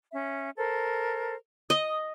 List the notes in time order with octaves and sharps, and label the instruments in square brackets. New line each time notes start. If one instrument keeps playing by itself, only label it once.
[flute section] C#4 E5
A4 A#4 C5
[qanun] D#5 [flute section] D#6